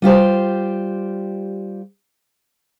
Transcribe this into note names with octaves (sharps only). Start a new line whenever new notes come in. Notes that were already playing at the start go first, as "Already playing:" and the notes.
G3 F4 G4 C5